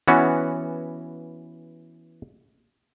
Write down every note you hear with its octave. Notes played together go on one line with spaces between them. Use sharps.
E3 B3 C#4 F#4